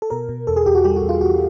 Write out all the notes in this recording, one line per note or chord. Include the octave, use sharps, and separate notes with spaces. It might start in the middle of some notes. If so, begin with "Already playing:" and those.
A4
B2 A#4
B2
E2 A4
G#4
E2 G4
F#4
G3 G4
F#4
E2
F4
E2 F#4